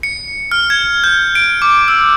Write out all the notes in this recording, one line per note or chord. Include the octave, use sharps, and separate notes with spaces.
C#7
F6
G#6
G6
D7
D6
E6